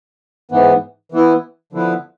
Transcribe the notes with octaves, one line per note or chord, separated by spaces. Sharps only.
G#2 E3 B3
E3 B3 E4
D3 F3 B3 E4 B4